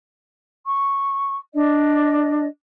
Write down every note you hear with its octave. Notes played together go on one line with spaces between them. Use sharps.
C#6
D4 D5 D#5